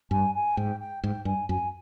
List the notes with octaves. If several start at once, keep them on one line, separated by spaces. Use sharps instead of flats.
G2 G#5
G#5
G#2 G5
G5
G#2 G5
G2 G#5
F#2 G#5